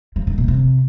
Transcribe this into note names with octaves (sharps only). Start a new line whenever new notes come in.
F3
D#3
A#2
C3